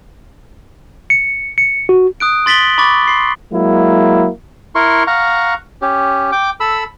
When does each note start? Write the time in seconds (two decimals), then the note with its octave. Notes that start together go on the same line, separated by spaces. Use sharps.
1.10 C#7
1.58 C#7
1.89 F#4
2.20 D#6 F#6 D7
2.46 C6 A6 B6 F#7 G7
2.78 B5 C#6 D6 A6
3.08 C6 C7
3.52 F#3 G#3 A#3 E4
4.75 E4 A#4 C6 C#6
5.07 F5 F#5 A#5 C#6
5.82 C#4 G4
6.32 G5 D6
6.60 A4 B5 E6